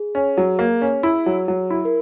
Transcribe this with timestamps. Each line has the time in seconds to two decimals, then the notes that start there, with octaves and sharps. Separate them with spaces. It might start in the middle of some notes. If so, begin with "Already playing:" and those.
Already playing: G#4
0.15 C#4
0.37 F#3
0.59 A#3
0.82 C#4
1.03 E4
1.26 F#3
1.48 F#3
1.70 E4
1.85 A#4